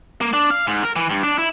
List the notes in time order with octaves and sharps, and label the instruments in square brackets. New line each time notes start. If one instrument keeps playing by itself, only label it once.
[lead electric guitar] A#3
D4
F5
G#2
A#4
E3
G2
D4
E4